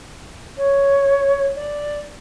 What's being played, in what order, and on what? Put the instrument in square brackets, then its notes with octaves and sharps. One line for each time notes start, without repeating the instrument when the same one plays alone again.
[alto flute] C#5
D5